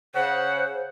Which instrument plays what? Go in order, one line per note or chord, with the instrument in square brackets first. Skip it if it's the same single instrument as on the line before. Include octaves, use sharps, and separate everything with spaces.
[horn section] C#3 F#5 [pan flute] C5